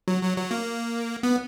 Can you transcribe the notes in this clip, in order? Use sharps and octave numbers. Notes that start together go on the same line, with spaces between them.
F#3
F#3
F#3
A#3
B3